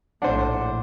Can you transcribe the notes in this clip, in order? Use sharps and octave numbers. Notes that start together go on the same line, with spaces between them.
A#1 A2 D4 C5 F#5